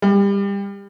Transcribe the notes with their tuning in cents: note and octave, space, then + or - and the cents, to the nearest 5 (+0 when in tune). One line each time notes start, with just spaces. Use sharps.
G3 +30